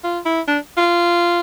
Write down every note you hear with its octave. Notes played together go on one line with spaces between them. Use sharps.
F4
E4
D4
F4